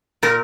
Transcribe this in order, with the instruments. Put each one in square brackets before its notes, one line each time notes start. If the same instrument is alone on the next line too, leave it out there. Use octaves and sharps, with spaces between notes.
[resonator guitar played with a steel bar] A#2 A#4